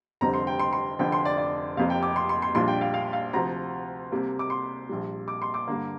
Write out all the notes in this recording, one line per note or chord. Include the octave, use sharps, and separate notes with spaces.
F1 F2 D3 G3 C4 A#5
C6
G5
C6
C6
F1 F2 D3 F3 G5
C6
D5
D5
F1 F2 C3 A#3 F5
G5
D6
C6
C6
C6
A#1 A#2 G3 D4 F4 C6
G5
F5
F5
F5
D2 C3 F3 A#5
C2 C3 A#3
D6
C6
A#1 A#2 G3
D6
C6
D6
G2 D3 A#3